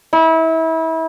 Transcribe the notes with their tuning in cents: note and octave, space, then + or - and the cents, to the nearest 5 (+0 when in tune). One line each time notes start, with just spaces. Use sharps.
E4 -30